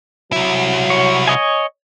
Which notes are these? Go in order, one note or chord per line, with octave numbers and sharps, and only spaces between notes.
C2 F#3 E4
C#5
C#5 D#5 G#5